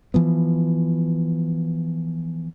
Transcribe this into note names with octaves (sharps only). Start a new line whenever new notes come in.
E3 F3 B3